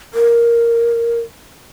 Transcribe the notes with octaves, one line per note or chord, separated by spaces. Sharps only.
A#4